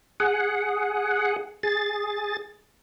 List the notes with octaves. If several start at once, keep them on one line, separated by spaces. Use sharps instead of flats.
G#4 F#5
G#4 A6